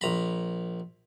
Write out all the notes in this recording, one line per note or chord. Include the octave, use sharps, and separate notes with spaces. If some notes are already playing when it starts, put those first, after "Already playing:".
A#1 A#5 B5